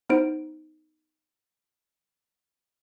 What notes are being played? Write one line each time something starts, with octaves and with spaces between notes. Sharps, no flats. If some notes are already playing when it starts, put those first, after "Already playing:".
B3 D#4 E4 C5 D7